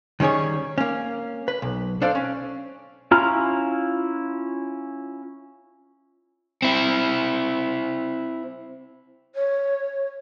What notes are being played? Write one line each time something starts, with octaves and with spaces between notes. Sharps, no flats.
D#3 G3 C#4 G#4 C#5
A#3 C#4
B4
B1
D4 A4 C5 D5 F5
C#4
C#4 E4 F4 A#5 F6
C4 E4
C#5